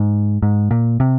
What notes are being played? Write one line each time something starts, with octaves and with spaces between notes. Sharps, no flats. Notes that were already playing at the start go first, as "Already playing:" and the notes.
Already playing: G#2
G#2
A#2
C3